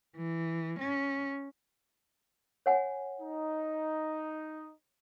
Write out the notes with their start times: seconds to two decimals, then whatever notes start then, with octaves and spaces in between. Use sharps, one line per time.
0.17 E3
0.79 C#4
2.66 C#5 F#5 G#5
3.21 D#4